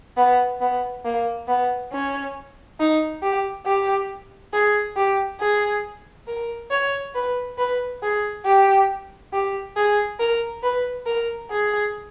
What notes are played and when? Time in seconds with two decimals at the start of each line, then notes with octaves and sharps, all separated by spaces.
0.17 B3
0.61 B3
1.05 A#3
1.48 B3
1.92 C#4
2.79 D#4
3.22 G4
3.66 G4
4.53 G#4
4.97 G4
5.40 G#4
6.27 A#4
6.71 C#5
7.15 B4
7.58 B4
8.02 G#4
8.45 G4
9.33 G4
9.76 G#4
10.20 A#4
10.63 B4
11.06 A#4
11.51 G#4